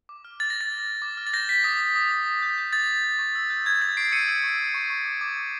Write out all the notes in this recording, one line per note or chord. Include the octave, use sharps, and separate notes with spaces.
D6
F6
F6 A6
A#6
F6
A6
F6
F6
D6
F6
A6
G6 A#6
G6 B6
D#6 A#6
D#6
D#6
D#6
D#6
G6
G6
D#6 A6
D#6
G6
C#6
E6
G6
G6 G#6
E6 A6
C#6 C7 D7
E6 C#7 D#7
E6
C#6
E6
C#6
C#6
D6
D6
D6